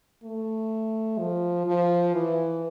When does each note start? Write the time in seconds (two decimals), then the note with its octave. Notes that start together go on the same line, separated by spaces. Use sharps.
0.23 A3
1.18 F3
1.67 F3
2.14 E3